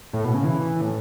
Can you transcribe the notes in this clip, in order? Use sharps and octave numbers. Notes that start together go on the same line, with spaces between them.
A2
B2
C#3
E3
A2